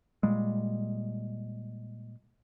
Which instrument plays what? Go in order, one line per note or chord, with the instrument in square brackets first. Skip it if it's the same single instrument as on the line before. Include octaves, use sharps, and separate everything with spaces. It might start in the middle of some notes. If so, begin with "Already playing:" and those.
[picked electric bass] A#2 G3 G#3